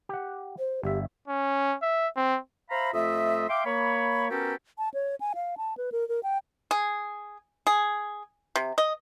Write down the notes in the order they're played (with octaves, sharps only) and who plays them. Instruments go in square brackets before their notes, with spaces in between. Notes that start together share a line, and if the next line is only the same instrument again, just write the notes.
[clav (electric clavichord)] G4 F#5
[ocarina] C5
[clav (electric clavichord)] G1 E5 [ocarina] G4
[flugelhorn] C#4
E5
C4
[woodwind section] C5 E5 F5 A#5 B5
F2 A3 F4 D#5 E5
E5 F5 G5 C6 D6
A#3 C#5 B5
B3 C#4 F#4 G4 A4 A#4
[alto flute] A5
C#5
G#5
F5
A5
B4
A#4
A#4
G5
[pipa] G#4
G#4
C3
D#5